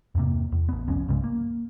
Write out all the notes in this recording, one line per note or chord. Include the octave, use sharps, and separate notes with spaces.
E2 G2 C3 A#3
E2
A1 B3
F1 C2 F2 C#4
C2 G2 C#3 G#3
A#3